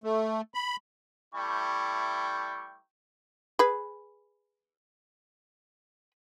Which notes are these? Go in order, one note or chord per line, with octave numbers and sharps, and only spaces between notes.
A3
B5
G3 A3 E4 G5 C#6
G#4 B4